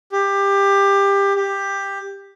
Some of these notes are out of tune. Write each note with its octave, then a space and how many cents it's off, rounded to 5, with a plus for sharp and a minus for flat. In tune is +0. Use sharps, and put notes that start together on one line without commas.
G4 +20
G4 +10